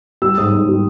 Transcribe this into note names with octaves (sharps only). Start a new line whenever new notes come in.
G3 E6
G#2 D#6
G#2
G3